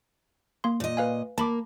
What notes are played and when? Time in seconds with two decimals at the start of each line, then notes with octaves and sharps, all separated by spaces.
0.64 A#3 C6
0.80 A#2 D#5
0.97 B4 F5 G#5
1.38 A#3 A5 B5 D6